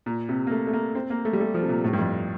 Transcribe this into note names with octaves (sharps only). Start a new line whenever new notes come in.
A#2
C3
A#3
A3
A3
A#3
C4
A#3
A3
G3
A3
F3
C3
A#2
A2
G2
F2